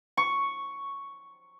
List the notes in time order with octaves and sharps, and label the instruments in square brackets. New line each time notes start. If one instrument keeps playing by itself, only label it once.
[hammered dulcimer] C#6